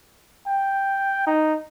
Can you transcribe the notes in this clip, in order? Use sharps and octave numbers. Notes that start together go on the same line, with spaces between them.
G5
D#4